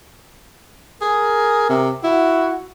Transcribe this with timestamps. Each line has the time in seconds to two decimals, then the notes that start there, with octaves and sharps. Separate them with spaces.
1.01 G#4 A#4
1.69 C3
2.04 E4 F#4